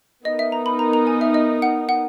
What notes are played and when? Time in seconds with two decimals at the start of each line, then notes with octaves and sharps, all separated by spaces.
0.25 B3 D#4 A#4 D#5
0.39 E5
0.52 A#5
0.66 B5
0.79 A#5
0.93 A#5
1.07 G#5
1.21 E5
1.34 D#5
1.62 F#5
1.89 F#5